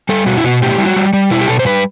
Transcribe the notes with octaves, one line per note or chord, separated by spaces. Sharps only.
G3 A4
B2 F#4
E4
B2 F#4
A2 G4
G3 E4
F#4
G3
G3
B2 E4
G4
B2 A4
C5
G3 B4